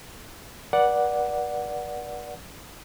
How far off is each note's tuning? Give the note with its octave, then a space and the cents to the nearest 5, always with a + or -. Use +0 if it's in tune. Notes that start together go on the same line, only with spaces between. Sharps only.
B4 -40 D5 +0 F#5 +0